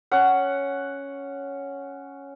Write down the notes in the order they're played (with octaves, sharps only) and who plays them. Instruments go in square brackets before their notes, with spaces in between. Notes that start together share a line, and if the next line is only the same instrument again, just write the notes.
[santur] C#4 F#5